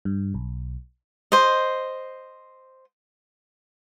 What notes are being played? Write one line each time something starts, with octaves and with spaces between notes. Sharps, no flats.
G2
B1
C5 D#5